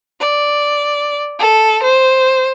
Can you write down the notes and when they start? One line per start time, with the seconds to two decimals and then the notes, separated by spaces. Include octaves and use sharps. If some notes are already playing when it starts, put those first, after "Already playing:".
0.18 D5
1.38 A4
1.81 C5